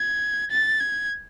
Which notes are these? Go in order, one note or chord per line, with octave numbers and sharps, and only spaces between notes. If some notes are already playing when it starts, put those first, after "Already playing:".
Already playing: G#6
A6
G#6